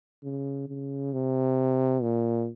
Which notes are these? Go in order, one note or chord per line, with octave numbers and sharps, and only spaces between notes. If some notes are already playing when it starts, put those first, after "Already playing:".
C#3
C#3
C3
A#2